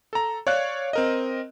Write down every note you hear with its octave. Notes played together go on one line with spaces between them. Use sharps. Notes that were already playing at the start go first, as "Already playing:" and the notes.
A4 A#5
C#5 D5 F5 F#6
C4 A#4 D#5